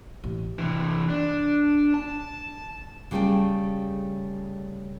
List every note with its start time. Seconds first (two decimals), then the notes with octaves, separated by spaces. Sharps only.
0.24 A1
0.59 C3 E3
1.09 D4
1.94 A5
3.11 C#3 G3 A3 G4 G#4 G5